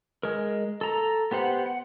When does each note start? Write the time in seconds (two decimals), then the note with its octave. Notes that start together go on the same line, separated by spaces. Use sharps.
0.23 G#3 A#4
0.81 A4 A#5
1.31 B3 G4 C5 F#5
1.66 F#5